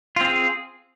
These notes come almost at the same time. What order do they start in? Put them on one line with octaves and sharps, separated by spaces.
F4 C4 G#4